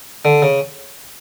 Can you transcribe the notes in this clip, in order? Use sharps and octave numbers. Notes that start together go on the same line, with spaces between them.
D3
C#3